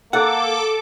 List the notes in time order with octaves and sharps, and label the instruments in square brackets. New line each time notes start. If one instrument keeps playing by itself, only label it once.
[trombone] A#3 [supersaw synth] A4 D6 [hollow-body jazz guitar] F#5